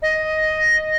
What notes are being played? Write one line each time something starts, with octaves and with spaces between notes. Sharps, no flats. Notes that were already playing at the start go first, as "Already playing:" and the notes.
D#5